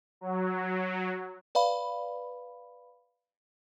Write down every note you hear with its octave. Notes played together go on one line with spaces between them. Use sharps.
F#3
B4 D5 F5 B5